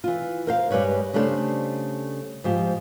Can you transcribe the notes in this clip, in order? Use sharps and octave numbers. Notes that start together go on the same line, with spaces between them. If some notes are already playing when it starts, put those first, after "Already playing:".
E3 F4
A#4 C5 F5
G2 G3 G#3 B4 C#5
C#3 G3 A3 D4 A#4 C5
G#2 F3 G4